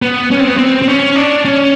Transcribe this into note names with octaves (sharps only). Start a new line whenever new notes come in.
B3
C#4
C4
B3
C4
C4
C#4
D4
C#4